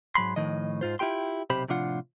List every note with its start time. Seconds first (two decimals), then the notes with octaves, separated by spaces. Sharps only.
0.15 G#2 F#3 B5 C6
0.36 A2 D#3 F3 D#5
0.81 G#2 F4 C5
0.99 E4 F4 G4 G5 C6
1.50 B1 C3 G4 C5 B5
1.68 A2 C3 F3 D4 F4 F#5